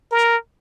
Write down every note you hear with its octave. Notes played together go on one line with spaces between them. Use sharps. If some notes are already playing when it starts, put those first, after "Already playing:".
A#4